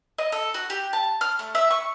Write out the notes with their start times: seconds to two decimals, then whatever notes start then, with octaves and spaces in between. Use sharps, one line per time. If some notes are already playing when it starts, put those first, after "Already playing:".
0.18 D#5
0.32 A4
0.54 F#4
0.70 G4
0.93 A5
1.21 F6
1.39 A3
1.55 E5
1.71 C#6